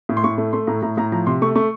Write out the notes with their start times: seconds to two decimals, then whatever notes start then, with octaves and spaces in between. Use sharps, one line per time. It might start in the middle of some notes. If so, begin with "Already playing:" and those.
0.09 A2
0.17 C6
0.24 A2 C#6
0.38 A3
0.53 A3 C6
0.67 A2 A#5
0.82 A2 A#5
0.97 A2 A#5
1.12 F3 A#5
1.27 C3 C6
1.42 A3 C#6
1.56 A3 C#6